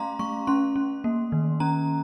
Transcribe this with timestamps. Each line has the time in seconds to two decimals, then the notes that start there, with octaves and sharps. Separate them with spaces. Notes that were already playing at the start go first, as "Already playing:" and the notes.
Already playing: A3 C#4 F5 A#5 C6
0.19 A3 C#6
0.47 C#4 C6
0.76 C#4
1.04 A#3
1.32 D#3
1.60 C#4 A#5